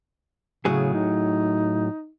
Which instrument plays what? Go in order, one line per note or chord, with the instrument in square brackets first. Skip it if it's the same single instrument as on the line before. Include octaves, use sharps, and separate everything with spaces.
[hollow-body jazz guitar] A2 F#3 G#4 [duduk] C#3
[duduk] D#4